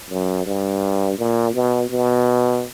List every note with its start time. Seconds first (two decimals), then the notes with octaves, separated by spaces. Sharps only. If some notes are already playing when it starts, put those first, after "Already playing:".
0.10 F#2
0.47 G2
1.18 A#2
1.54 B2
1.90 B2